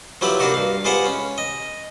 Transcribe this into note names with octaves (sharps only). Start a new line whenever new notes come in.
F3 F#3 E4 G4 B4
A#3 D4 D#4 F#4 G4
G2 F5
G#3 F4 G4 B4 C5 F#5
C#4
D#5